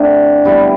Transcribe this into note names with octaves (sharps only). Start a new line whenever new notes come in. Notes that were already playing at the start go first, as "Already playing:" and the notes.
Already playing: D3 A3 C4 D4 E4
D3 G3 B3 E4